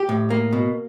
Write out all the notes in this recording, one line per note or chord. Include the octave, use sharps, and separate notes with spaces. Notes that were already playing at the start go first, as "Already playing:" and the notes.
Already playing: G4
A2
A#3
B2